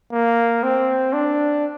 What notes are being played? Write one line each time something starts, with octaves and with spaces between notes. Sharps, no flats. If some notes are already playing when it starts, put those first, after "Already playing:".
A#3
C4
D4